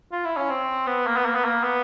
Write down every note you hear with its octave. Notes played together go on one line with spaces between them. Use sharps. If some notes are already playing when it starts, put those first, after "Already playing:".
F4
E4
C#4
C4
B3
A#3
B3
A#3
B3
A#3
B3